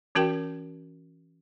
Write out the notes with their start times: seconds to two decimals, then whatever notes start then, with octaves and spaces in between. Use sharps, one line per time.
0.15 E3 C#4 F#4 A#4 G5